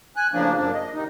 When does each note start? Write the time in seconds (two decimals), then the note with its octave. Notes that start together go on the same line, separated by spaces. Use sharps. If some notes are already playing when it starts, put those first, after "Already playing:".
0.16 G#5 F#6
0.33 A2 C#3 F3 A#3 D4
0.56 F#2 A#2 D4
0.74 D#5
0.93 C3 D#3 D#4